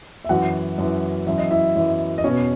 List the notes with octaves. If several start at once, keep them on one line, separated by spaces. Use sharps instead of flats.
E5
F#2 E3 F#4 F#5
F#2 E3
F#2 E3 E5
D#5
E4 E5
F#2 E3
D#5
E2 B2 C#4 C#5